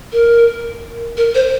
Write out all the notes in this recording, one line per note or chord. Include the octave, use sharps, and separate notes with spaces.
A#4
A#4
C5